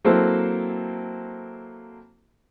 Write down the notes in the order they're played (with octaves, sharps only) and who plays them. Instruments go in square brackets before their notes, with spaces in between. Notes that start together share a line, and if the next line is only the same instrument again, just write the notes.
[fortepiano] F#3 A#3 C4 E4 A4 C5